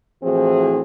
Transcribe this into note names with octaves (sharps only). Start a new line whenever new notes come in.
A2 E3 F3 C4 F#4 G#4